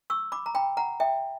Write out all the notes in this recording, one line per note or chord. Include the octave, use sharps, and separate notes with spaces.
C#6 E6
B5 D6
A#5
G5 B5
F#5 A#5
E5 G5